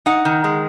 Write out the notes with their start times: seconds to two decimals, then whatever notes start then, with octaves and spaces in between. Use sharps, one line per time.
0.06 D#4 F#5
0.25 D#3
0.44 G#3